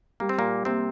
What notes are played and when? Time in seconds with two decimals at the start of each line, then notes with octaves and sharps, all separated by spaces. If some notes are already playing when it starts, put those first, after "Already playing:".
0.20 G3 A#3
0.29 C4
0.39 A#2 A#3
0.65 C3 A#3 C4